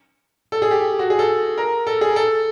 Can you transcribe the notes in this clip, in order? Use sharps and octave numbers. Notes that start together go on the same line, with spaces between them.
A4
G#4
G4
F#4
G#4
A4
A#4
A4
G#4
A4